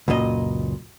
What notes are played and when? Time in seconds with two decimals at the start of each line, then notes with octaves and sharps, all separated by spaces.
0.08 C#2 F#2 A#2 D#5